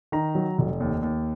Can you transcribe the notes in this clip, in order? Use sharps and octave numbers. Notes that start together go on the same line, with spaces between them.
D#3 A#5
F#3
F1
D#2
D#2